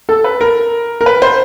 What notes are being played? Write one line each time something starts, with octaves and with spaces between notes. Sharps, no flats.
A4
B4
A#4
A#4
B4
C5